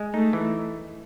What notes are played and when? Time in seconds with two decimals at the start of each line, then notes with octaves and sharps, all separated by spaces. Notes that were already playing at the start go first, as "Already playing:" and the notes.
Already playing: G#3
0.14 A3 D#4
0.33 E3